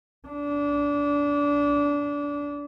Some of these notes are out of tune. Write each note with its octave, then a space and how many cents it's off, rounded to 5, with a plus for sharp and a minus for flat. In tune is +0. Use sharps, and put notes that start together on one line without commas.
D4 -25